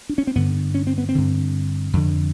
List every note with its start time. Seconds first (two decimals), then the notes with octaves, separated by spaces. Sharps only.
0.09 D4
0.18 C#4
0.27 C4
0.35 G2 D3 B3
0.74 C#4
0.87 C4
0.98 B3
1.09 C4
1.15 G2 D3
1.93 F2 D3